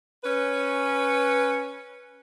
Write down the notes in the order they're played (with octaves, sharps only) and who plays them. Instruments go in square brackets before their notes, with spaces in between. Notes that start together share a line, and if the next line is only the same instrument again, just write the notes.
[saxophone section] C#4 B4